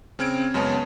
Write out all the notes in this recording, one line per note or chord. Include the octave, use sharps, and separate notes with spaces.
C#3 C4 F6 G#6 D7
F#2 C#3 G#3 B3 C#5 A5